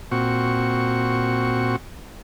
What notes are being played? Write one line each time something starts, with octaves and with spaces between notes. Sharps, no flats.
A#2 C4 F#4 C#6